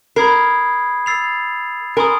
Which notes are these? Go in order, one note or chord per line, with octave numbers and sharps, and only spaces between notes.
A#4 B5 D#6 G#6 C7
E6 A6 C7 F7
A#4 G#5 C6 D#6